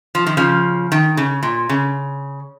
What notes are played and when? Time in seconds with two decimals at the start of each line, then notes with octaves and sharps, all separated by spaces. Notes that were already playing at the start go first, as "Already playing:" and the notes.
0.15 F3
0.26 D#3
0.37 C#3 F3
0.92 D#3
1.17 C#3
1.43 A#2
1.69 C#3